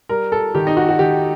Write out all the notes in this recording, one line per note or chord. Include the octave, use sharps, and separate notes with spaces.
G3 A#4
A4
D#3 G4
D#4
F#4
F#4
D#3 G4